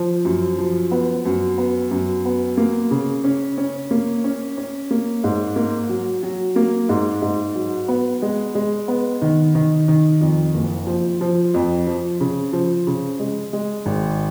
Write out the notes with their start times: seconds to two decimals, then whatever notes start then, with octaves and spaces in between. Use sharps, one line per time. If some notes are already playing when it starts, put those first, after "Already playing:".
Already playing: F3
0.25 F#2
0.58 F3
0.91 B3
1.25 F#2
1.58 B3
1.91 F#2
2.25 B3
2.57 A#3
2.91 C#3
3.24 C#4
3.57 C#4
3.91 A#3
4.24 C#4
4.57 C#4
4.91 A#3
5.24 G#2
5.56 A#3
5.89 F#3
6.23 F#3
6.56 A#3
6.89 G#2
7.22 G#2
7.55 F#3
7.88 B3
8.22 G#3
8.55 G#3
8.88 B3
9.21 D#3
9.55 D#3
9.88 D#3
10.21 F2
10.54 F#1
10.87 F3
11.21 F3
11.54 F2
11.87 F3
12.20 C#3
12.53 F3
12.87 C#3
13.19 G#3
13.53 G#3
13.86 G#1